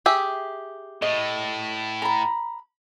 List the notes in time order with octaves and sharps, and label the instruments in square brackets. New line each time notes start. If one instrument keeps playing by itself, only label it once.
[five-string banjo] G4 G#4 E5
[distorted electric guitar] A2 [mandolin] D#5
[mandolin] A#5 B5